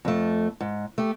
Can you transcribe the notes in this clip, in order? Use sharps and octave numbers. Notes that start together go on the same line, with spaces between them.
F2 A3
G#2
A3 G4